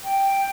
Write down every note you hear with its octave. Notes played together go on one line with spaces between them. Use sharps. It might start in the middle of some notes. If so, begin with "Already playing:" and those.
G5